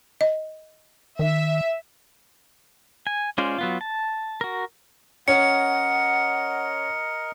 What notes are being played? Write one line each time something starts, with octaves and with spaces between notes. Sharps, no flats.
D#5
D#3 E5
G#5
G#3 C#4 F4 C5 D5
F#3 B3 F4
A5
F#4 A#4
C#4 A#4 D#5 F#5 C#7